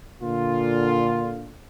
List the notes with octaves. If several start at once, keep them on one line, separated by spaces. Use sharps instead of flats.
A#2 D3 F4